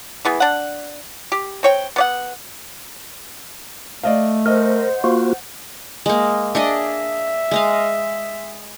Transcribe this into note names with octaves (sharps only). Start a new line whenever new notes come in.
E3 B3 G#4
D4 F#5
G4
C4 C#5 G5
B3 D5 F#5
A3 D5 D#5 F5
A#4 C5 D#5 F#5
A#3 F4 F#4
G#3 A#3
D4 G#4 D#5 E5
G#3 D#5 F5